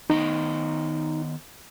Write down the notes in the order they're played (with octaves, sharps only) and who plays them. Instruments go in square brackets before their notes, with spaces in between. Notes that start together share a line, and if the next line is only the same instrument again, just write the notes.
[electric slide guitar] D#3 B3 D#5 [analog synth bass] D#4